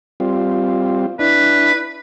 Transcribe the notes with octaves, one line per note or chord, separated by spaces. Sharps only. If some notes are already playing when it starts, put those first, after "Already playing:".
G3 C4 F4
D4 E4 B4